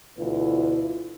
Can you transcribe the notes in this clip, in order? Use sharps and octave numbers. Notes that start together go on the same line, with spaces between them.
D2 B2 E3 E4 F4 B4